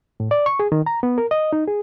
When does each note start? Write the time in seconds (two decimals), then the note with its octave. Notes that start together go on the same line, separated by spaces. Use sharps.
0.20 A2
0.31 D5
0.46 C#6
0.59 G#4
0.72 D#3
0.86 A#5
1.03 B3
1.18 A#4
1.31 D#5
1.53 D#4
1.67 G#4